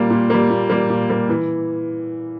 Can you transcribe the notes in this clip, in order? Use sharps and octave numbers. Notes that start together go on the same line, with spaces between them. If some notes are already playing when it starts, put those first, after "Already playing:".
Already playing: A#2 G3 A#3
A#2
G3 A#3
A#2
G3 A#3
A#2
G3 A#3
E3